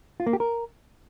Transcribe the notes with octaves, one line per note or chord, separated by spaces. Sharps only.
F4
A#3
G4
A#4